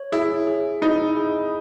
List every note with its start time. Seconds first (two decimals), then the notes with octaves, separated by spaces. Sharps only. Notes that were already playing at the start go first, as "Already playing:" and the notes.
Already playing: C#5
0.12 E4 G#4
0.47 G#4
0.82 D#4 E4
1.16 G#4